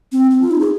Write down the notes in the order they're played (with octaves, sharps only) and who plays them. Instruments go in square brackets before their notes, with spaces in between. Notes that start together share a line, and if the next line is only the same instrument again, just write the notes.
[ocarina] C4
C4
F4
D#4
G#4